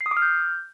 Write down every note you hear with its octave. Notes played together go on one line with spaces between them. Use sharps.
C7
D#6
D6
F6
G6